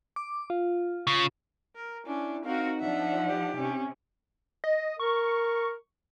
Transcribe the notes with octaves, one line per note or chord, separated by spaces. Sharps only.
D6
F4
C#3
A#4
C#4 D4 E4
C4 D#4 F#4 A#4 F5
F3 D4 E5 F#5
G4
C3 C#4
D#5
A#4 C#6